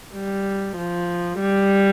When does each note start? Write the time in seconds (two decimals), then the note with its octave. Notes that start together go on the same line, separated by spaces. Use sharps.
0.13 G3
0.76 F3
1.40 G3